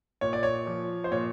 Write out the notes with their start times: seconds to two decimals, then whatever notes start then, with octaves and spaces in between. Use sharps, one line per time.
0.21 A#2 C#5
0.33 D5
0.43 C#5
0.67 F3
1.04 C5
1.12 A#2 C#5